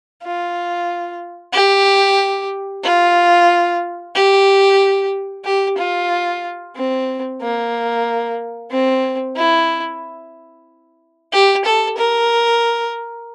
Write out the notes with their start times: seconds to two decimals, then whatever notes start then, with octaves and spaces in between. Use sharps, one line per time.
0.23 F4
1.53 G4
2.84 F4
4.15 G4
5.45 G4
5.78 F4
6.76 C4
7.41 A#3
8.71 C4
9.36 E4
11.33 G4
11.65 A4
11.97 A#4